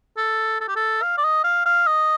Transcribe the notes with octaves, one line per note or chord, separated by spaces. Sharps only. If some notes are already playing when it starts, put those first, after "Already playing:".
A4
A4
G4
A4
F5
D5
D#5
F5
F5
D#5